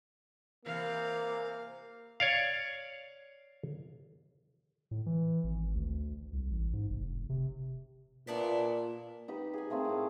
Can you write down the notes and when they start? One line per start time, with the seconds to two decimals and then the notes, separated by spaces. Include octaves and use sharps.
0.66 C3 E3 A#3 F5
2.20 C#5 D5 F5
4.91 A2
5.06 E3
5.44 G#1
5.75 D2
6.33 C2
6.51 A1
6.73 G#2
6.90 F1
7.29 C3
8.27 A#2 B3 D4 E4
9.28 D#4 G4 B4
9.54 G#4 D#5 G#5
9.70 A3 A#3 C4 G#4
9.85 A2 D6